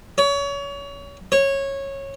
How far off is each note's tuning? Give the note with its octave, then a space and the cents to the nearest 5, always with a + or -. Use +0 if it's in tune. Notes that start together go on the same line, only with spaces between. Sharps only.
C#5 +30
C#5 -15